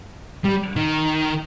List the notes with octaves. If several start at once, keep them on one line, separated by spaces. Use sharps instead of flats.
G3
D#3